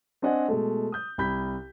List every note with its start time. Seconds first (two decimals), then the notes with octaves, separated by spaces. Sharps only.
0.22 C4 D4 D5 D#5 F#5 G#5
0.48 B2 G#3 A3
0.92 D#6 G6
1.18 C2 B5 G6 B6